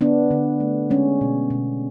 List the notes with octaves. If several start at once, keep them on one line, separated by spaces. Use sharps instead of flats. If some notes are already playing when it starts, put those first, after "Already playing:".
D3 B3 D4
D3
A3
G#3 C#4
B2
B2